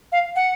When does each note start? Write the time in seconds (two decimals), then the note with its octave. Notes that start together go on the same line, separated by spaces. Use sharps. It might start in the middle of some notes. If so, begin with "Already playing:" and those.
0.12 F5
0.36 F#5